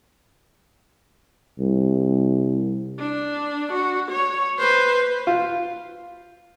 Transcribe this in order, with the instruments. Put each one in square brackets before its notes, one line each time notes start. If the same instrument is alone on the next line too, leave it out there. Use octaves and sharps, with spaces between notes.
[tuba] C2
[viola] D4
F#4
C#5
B4 C5
[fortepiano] F4